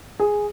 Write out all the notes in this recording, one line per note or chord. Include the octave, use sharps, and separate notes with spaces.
G#4